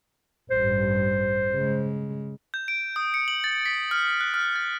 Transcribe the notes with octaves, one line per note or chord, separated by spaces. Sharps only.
A1 G2 C5
C#3 G#3
G6
D7
D#6
C#7
F#7
A6
B6
F6
F#6
F6
A6